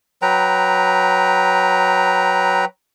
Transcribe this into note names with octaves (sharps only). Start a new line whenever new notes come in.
F#3 B4 G5 A#5